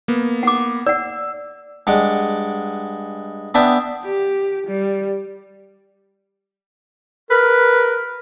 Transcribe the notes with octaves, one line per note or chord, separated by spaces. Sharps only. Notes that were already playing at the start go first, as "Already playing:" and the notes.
A#3 B3
F#5 D6
D5 F#5 E6
G2 G#3 F#5 D6
B3 D4 E5 G5 G#5 D#6
G4
G3
A#4 B4